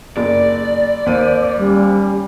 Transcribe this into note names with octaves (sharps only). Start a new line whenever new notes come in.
F#1 D5
D#2 C5 D#7
G3 C#4